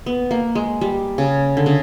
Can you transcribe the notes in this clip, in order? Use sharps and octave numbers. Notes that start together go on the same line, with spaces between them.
B3
A#3
G#3
G3
C#3
D3
C#3